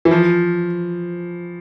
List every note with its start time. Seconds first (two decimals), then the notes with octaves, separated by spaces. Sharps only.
0.05 E3
0.11 F3